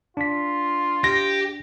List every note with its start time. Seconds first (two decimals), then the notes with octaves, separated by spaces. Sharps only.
0.17 D4 F4 B6
1.04 G4 A#6